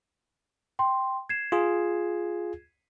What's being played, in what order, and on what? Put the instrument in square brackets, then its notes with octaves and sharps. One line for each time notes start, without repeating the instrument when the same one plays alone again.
[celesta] G5 C6
G#6 C7 E7
[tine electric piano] F4 G#4